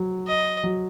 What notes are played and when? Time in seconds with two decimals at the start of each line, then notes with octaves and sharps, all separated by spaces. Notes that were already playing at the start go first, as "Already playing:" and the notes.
Already playing: F#3
0.27 D#5
0.64 F#3